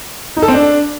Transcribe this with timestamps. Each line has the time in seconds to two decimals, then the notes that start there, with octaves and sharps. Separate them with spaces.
0.37 D#4
0.42 A4
0.48 C4
0.54 D4